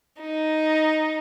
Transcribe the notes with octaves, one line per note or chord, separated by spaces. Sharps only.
D#4